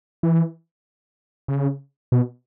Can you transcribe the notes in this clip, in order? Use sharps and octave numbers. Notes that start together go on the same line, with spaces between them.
E3
C#3
B2